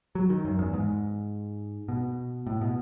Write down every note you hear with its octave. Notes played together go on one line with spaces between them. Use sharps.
F#3
D#3
F#2
E2
G#2
B2
A2
B2